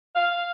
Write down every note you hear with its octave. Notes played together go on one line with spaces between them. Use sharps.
F5